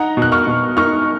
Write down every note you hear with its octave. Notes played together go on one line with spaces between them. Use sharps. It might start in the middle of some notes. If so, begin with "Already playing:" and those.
Already playing: D#4 F#5 A#5
B2
F#6
C#6 F6
B2
D#4 C#6 F6